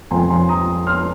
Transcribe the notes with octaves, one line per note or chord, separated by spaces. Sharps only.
F2 F3 G#5 C6
G#5 C6
A#5 D#6
C6 F6